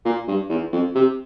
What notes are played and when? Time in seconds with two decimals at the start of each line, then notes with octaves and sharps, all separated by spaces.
0.05 A#2
0.28 G2
0.49 E2
0.72 F2
0.95 C3